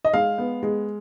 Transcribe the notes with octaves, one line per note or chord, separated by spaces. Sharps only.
D#5
G#3 F5
B3
G#3